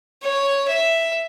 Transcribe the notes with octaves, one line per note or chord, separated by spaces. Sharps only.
C#5
E5